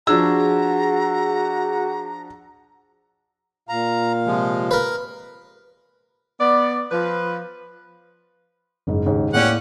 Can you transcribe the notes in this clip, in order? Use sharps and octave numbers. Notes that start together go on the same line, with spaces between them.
F3 D4 F#4 G#4 A#5 E6
A#2 F5 A#5
C3 F3 G#3
A#4 B4
B3 D5
F3 B4
F#1 G#2
D#2 G#2 C#3
A2 A#3 C#4 G4 D5 F#5